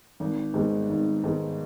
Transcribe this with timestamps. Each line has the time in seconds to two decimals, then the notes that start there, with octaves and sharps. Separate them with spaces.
0.20 G#1
0.54 G#2 D#3 G#3 B3
0.89 G#1
1.23 G#2 D#3 G#3 B3